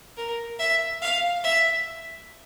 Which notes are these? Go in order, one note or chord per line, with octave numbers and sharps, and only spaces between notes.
A#4
E5
F5
E5